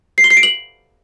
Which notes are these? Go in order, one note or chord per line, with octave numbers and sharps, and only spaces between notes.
C7
G7
C7
D7
F#7